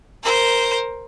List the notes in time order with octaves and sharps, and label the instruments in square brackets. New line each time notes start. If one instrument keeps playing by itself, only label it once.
[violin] A#4 C5